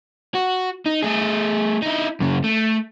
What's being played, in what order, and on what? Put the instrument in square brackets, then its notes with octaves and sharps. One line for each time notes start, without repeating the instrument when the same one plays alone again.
[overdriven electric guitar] F#4
D#4
A3 G#4
D#4 E4
F#2 C#3
A3